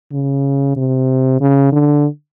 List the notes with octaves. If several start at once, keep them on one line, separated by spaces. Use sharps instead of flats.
C#3
C3
C#3
D3